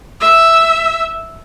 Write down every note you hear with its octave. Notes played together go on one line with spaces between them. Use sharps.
E5